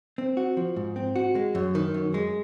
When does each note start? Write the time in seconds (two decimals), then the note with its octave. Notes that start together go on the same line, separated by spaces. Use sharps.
0.18 C4
0.37 F#4
0.57 F3
0.76 G#2
0.96 C4
1.16 F#4
1.35 G#3
1.55 F#2
1.75 D#3
1.94 F#2
2.14 G#3